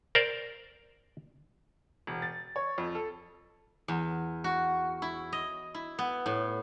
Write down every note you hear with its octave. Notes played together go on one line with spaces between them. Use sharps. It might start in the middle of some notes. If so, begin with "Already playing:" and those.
A#4 C5 D5
E1
A6
C#5
F2
A4
E2
F#4
E4
D#5
E4
B3
A2